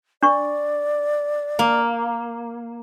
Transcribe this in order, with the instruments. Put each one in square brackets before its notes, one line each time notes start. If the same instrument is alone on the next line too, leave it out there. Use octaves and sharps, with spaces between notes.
[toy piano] D4 C#6 [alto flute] D5
[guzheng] A#3